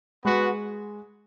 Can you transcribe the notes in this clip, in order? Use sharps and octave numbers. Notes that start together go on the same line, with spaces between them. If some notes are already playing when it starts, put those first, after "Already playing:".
G#3 B3 F#4 B4 F#5